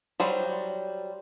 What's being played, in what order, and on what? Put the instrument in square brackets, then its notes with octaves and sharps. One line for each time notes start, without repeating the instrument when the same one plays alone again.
[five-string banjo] F#3 G3 C5